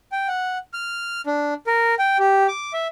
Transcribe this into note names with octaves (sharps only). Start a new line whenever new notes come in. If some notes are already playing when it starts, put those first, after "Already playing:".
G5
F#5
F6
D4
A#4
G5
G4
D6
E5